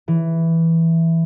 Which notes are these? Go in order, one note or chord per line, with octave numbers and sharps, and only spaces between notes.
E3